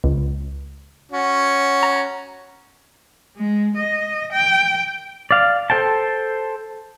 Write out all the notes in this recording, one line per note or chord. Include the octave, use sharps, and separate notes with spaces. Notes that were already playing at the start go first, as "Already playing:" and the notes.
C#2
C#4 F#4
A#5
G#3
D#5
G5
D5 F5
A4 C5 G5 A5